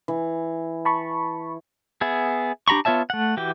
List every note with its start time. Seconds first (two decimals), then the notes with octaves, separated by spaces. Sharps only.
0.08 E3
0.85 A5 B5 C#6
2.01 B3 G#4 E5
2.68 D4 G4 A#5 B5 C#6
2.85 B3 F4 C#5 E5 A5
3.10 A3 F#5
3.37 E3 F#4 G4 G5